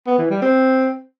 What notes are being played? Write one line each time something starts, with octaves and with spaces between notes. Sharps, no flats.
B3
E3
G3
C4